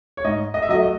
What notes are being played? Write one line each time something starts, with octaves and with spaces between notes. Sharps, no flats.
C#5
G#2 D#5
D#5
E5
F#3 A3 D#5
D#5